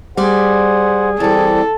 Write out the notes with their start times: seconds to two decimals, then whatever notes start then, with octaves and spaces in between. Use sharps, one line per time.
0.17 G3 G#4 C5 D5 F#5
1.20 E3 G3 C4 A4 D5